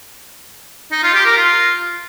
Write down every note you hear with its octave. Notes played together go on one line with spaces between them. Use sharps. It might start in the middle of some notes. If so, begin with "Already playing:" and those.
D#4
F4
G4
A#4
F4